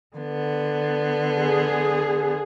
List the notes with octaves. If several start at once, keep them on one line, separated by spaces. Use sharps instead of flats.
D3 B3
G#4